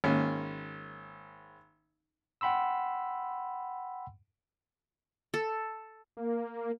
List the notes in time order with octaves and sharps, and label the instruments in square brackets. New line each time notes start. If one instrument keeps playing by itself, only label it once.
[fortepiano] G#1 A#3 C#4
[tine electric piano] F#5 G5 B5 C6 E6
[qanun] A4
[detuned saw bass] A#3